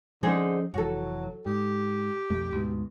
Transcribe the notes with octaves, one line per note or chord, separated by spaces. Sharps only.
D3 F3 C4 C#4 D#4 G#4
F1 E3 F#3 F#4 A4
G#2 G4
B1 F2 A3
D2 G#2 B2